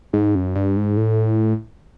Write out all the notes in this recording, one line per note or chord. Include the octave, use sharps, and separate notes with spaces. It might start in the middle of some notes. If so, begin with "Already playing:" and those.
G#2
F#2
G2
G#2
A2